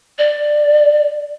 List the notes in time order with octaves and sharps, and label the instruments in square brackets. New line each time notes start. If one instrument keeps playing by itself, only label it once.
[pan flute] D5